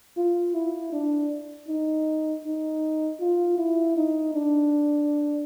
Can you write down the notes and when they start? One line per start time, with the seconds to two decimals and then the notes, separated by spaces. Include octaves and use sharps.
0.17 F4
0.54 E4
0.93 D4
1.68 D#4
2.45 D#4
3.20 F4
3.58 E4
3.97 D#4
4.34 D4